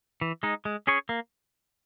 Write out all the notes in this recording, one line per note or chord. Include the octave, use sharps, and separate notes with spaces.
E3
G#3 D#4
G#3
C#4 G#4 C#5
A#3